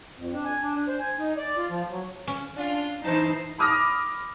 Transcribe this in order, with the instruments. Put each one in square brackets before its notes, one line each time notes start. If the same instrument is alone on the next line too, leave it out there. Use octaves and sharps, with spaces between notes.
[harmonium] F2
D4
G#5
D4
D4
C5
G#5
D#4
D5
F4
F3
F#3
[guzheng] C#4
[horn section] D4 F4
[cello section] E3 D#4 E4 [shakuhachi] C5 [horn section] A5
[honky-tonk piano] B5 D6 D#6 F6 A#6